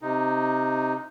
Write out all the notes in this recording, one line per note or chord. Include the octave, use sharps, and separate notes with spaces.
C3 D#4